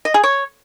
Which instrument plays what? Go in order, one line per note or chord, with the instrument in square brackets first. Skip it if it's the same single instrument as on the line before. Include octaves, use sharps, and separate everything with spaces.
[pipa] D#5
G#4
C#5